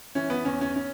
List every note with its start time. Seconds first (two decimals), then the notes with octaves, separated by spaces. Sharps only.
0.15 E3 C#4
0.30 B3
0.45 E2 C#4
0.61 C#4
0.76 C#4